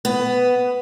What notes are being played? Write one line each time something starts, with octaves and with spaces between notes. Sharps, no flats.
B3